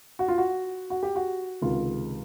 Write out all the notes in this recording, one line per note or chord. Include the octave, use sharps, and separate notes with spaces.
F#4
F4
F#4
F#4
G4
F#4
C#2 C3 D#3 F4